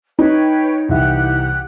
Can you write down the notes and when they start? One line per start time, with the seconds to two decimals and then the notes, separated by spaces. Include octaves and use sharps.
0.19 D#4 B4 C#5 G5
0.89 C2 E3 G4 E5 F#5 F#6